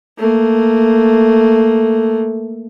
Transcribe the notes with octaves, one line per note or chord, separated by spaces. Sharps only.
A3 A#3